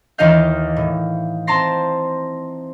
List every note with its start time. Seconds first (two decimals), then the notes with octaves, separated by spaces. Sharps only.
0.18 D#2 E3 D#4 D#5 F5 G6
0.76 A2
1.47 C4 A5 A#5 C6 A#6